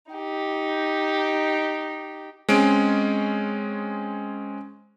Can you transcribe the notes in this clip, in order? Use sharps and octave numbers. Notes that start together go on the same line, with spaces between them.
D#4 G4
G#3 C4 C#4 G#4 D7